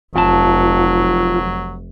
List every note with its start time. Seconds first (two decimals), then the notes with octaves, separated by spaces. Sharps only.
0.16 F1 F2 F#3 F4 A5